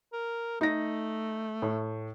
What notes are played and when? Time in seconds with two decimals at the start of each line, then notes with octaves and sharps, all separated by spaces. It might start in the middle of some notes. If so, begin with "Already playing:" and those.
0.13 A#4
0.61 A3 D#4 A#6
1.62 A2